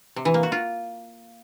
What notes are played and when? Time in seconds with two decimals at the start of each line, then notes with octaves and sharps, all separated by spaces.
0.16 C3
0.25 E3
0.34 A#3
0.43 F#4
0.52 F4